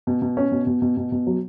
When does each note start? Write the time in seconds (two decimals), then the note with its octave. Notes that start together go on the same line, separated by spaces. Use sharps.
0.07 B2
0.22 B2
0.37 C#4
0.52 B2
0.67 B2
0.82 B2
0.97 B2
1.12 B2
1.27 F#3